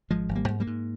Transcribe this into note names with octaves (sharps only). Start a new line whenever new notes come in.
G#1 F3 G#3
G#1
G3 A#3
G#2
G3 A#3
G#2